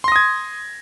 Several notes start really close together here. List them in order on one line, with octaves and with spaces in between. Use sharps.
C6 A#6 D#6 G#6